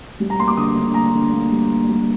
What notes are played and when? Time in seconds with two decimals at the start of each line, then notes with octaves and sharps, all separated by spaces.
0.20 G3
0.30 A#5
0.39 A#3 C6
0.48 D6
0.57 D3 D#6
0.76 D3
0.94 A#3 A#5
1.14 D3
1.32 A#3
1.51 G3
1.70 A#3
1.89 G3